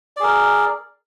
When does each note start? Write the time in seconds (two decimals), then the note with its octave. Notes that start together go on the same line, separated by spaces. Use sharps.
0.17 D5
0.20 G#4
0.24 A#4